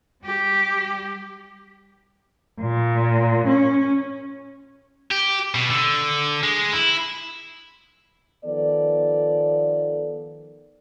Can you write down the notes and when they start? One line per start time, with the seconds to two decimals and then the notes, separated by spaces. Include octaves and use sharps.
0.24 G3 G4
2.61 A#2
3.48 C#4
5.11 G4
5.55 B2
5.70 D3
6.43 G#3
6.73 E4
8.45 D#3 F3 B3 A4 D5